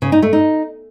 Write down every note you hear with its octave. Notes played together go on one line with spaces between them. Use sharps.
C#3
D#4
A3
D#4